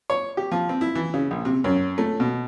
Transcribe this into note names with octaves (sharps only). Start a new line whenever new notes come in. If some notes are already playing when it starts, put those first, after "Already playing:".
C#5
G4
F3
C4
E4
E3
C#3
A#1
C3
F#2
A3
B2